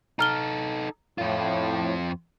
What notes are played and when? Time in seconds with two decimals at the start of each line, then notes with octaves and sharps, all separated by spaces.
0.19 D#4 A4 A#5 F6 G7
1.18 F2 A2 F4